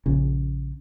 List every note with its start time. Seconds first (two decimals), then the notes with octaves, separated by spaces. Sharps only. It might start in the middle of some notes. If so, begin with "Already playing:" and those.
0.06 A#1 C#3